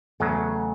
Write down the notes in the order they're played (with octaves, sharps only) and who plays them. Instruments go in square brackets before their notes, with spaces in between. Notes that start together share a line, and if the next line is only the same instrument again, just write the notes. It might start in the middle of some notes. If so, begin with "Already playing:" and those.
[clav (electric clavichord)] E2 C#3 F#3 [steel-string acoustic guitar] A3 A4